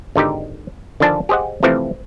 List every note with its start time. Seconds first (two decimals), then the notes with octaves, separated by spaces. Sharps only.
0.15 G#1 D3 D#4 G4
1.00 D3 D#3 F3 D4 G#5 A5
1.29 G4 G#4 C5 D#5 F#5
1.63 C3 E3 F3 A3 C4